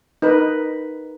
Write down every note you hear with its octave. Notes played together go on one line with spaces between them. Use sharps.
D#4 A#4 B4